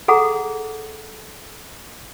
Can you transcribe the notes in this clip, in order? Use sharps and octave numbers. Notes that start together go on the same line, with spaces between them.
G#4 A4 F#5 A#5